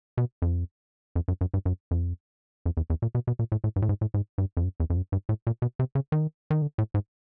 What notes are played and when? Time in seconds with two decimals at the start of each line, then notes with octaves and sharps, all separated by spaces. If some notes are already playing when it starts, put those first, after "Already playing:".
0.18 B2
0.42 F2
1.16 F2
1.28 F#2
1.41 F#2
1.54 G2
1.65 F#2
1.91 F2
2.66 F2
2.77 E2
2.90 E2
3.02 A#2
3.15 B2
3.27 B2
3.39 A#2
3.52 A2
3.64 A2
3.76 G2
3.82 A2
3.89 G#2
4.01 A2
4.14 G#2
4.38 G2
4.57 F2
4.64 F#2
4.80 E2
4.90 F2
4.97 F#2
5.12 G2
5.29 A2
5.47 A#2
5.62 B2
5.79 C3
5.95 C#3
6.12 D#3
6.50 D#3
6.62 D3
6.78 A2
6.94 G#2